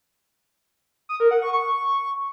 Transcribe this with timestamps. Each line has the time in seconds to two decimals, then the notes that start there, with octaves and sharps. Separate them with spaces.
1.09 D#6
1.20 A#4
1.31 F#5
1.42 C#6
1.53 C#6